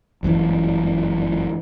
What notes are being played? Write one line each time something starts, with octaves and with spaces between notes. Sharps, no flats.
G1 F#2 A#2 E3